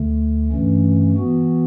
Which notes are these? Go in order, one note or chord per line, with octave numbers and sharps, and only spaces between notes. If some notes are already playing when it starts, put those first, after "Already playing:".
Already playing: D2 D3 A3
G2 E3 A3 C#4
E3 B3 F#4